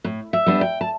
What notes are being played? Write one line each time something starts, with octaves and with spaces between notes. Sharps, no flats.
A2
E5
G3 B3 D4
G5
A5